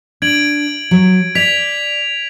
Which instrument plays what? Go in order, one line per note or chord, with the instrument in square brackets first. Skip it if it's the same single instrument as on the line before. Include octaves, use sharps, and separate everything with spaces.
[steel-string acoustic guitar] D4 [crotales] G#6 D7 F#7
[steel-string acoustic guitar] F#3
[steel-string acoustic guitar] D5 [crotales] G#6 B6 F7